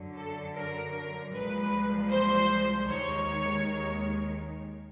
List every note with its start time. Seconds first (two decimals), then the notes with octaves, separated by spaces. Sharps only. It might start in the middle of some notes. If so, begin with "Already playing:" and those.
Already playing: F#2 D3 F#3
0.16 A4
0.55 A#4
0.94 A#4
1.32 C2 A#2 F3 G#3 B4
2.10 C5
2.88 D#2 D#3 G#3 C#5